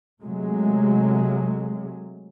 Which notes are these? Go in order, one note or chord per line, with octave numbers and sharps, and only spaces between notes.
C3 F#3 G#3 A3